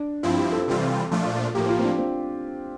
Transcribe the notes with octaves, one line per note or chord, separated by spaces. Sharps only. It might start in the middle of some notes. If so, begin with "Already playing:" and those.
Already playing: D4
G2 F3 C4 E4 F4
G4
A4
C3 E3 G3 C4 F4
A#2 F3 A3 D4 F4
A2 F3 A#3 G4
F4
C4
D4
C4